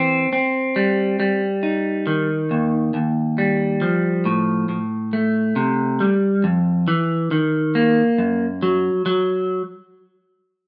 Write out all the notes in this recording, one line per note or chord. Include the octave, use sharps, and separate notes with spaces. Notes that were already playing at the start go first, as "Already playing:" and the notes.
Already playing: E3 C4
C4
G3
G3
D#4
D#3
D#2
D#2
G3
F3
A2
A2
A3
C3
G3
F2
E3
D#3
A#3
F#2
F#3
F#3